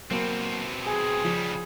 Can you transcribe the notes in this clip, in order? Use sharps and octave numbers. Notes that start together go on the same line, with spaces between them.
B2 F#3 A#3 C4
G#4 G#5
C#3 F3 G3